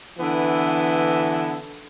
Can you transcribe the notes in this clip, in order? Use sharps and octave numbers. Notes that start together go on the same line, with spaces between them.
D3 E3 B3 E4